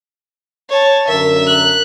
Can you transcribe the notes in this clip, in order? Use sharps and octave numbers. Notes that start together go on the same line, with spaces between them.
C#5 A5
F#2 D3 A#4 E5
F#6